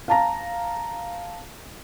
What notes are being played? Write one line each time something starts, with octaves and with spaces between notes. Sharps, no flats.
F5 A5 A#5